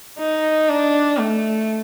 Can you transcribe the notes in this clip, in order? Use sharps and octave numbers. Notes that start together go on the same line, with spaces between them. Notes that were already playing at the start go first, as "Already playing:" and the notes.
D#4
D4
A3